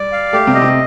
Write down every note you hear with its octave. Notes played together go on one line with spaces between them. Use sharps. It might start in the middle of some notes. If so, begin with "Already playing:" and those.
Already playing: G3 D5
F5
A3 G4
C3 C4
D#5
C3 C4